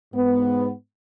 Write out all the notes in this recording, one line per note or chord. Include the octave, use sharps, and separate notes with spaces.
G#2 B3